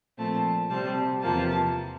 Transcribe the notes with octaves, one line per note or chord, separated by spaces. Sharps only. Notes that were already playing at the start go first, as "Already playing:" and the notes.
A#2 F3 A3 C4 A5
C3 G3 C4 A5
E2 C3 F3 A#3 A5